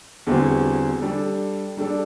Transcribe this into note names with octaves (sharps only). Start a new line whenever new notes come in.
E2 D3 G3 C4 F#4
G3 D4 A4 D5
G3 D4 A4 D5